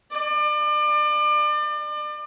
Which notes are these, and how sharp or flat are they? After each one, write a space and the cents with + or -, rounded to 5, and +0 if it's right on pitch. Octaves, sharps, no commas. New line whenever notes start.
D5 +35